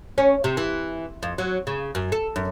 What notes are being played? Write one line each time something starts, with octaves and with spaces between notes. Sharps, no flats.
C#4
C3
E3
F2
F#3
C#3
F#2
A4
F#2